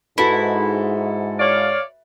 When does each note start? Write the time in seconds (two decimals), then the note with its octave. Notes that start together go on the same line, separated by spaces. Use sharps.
0.18 G#2 E4 F#4 A4 B4
1.40 C#5 D5 F5